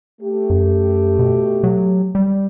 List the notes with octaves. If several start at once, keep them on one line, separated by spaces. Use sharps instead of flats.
A3 G4
F#2
B2
F#3
G3